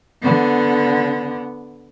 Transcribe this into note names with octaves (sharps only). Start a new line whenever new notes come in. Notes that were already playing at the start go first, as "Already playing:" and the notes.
D3 B3